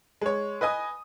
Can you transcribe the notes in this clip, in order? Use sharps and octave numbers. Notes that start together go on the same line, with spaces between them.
G#3 C#5
B4 D#5 G#5 D#6